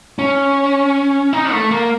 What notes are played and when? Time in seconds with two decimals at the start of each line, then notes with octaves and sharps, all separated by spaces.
0.19 C#4
1.33 D#4
1.52 A3
1.71 A#3